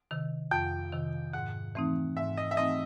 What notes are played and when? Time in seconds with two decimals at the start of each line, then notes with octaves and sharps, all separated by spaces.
0.11 C3 D#3
0.51 F2 G5
0.92 C3 D#3
1.33 G#2 F#5
1.75 E3 A3 C4 D#4
2.17 G#2 E5
2.37 D#5
2.51 E5
2.57 E3 A3 C4 D#4 D#5